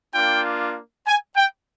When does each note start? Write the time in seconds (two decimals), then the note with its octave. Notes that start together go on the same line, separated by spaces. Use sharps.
0.14 A#3 D4 F4 G5
1.07 G#5
1.37 G5